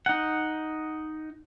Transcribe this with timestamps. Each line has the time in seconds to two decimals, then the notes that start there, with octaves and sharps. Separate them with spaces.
0.06 D#4 F#5